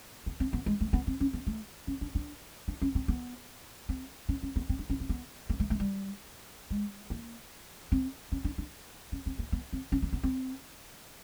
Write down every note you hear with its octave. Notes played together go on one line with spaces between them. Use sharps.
B3
C4
B3
G#3
A3
B3
C4
C#4
B3
A3
C#4
D4
D4
D4
C#4
C4
B3
C4
C#4
C#4
B3
C4
D4
C#4
C4
B3
A#3
A3
A3
G3
G#3
A#3
C4
C#4
D4
D4
C#4
C4
A#3
B3
C4
C#4
A#3
B3
C4